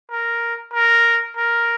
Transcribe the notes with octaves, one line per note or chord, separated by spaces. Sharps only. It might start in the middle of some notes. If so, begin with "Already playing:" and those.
A#4
A#4
A#4